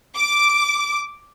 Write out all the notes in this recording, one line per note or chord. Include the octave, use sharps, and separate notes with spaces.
D6